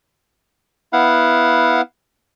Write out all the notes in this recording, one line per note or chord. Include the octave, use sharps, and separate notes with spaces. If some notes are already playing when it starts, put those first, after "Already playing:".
B3 E4 F5 F#5